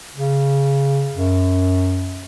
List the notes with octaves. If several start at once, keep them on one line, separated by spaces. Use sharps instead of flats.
C#3
F#2